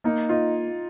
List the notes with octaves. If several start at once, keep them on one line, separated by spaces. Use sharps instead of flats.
A#3 D#4
D#4 F4